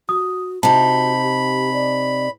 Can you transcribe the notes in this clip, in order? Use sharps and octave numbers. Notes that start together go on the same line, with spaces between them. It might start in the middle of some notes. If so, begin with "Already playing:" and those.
F#4 D#6
C3 D#4 F#4 A5 B5
G4
D5